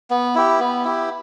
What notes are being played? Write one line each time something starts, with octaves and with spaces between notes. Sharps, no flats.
B3
E4 G4
B3
E4 G4